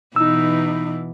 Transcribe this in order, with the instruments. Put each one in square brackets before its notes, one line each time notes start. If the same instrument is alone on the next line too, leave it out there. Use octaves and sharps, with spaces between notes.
[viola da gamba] B2 E3 [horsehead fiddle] D#4 [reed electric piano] E6